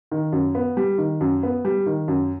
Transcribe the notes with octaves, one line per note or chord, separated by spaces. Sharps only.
D#3
F#2
B3
G3
D#3
F#2
B3
G3
D#3
F#2